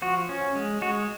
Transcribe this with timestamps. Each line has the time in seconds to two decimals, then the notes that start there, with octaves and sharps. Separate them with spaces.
0.02 F3 F#4
0.29 C#4
0.55 G#3
0.82 G#3 F#4